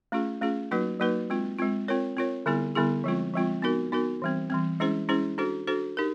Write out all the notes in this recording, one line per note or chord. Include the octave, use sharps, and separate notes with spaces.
A3 C#4 F4 G#4
A3 C#4 F4 G#4
F#3 A#3 D#4 F#4 B4
F#3 A#3 D#4 F#4 B4
G#3 C4 F4
G#3 C4 F4
C4 F4 A#4 C#5
C4 F4 A#4 C#5
D3 G3 B3 E4 G#4
D3 G3 B3 E4 G#4
F3 G#3 C4 F4
F3 G#3 C4 F4
B3 D#4 F#4 A#4
B3 D#4 F#4 A#4
E3 G3 C4
E3 G3 C4
G#3 C#4 E4 G#4 C5
G#3 C#4 E4 G#4 C5
D4 F#4 A4 C5
D4 F#4 A4 C5
D#4 G4 A#4